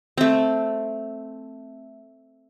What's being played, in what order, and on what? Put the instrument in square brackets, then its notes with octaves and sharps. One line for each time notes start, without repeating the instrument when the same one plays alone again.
[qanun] A3 C4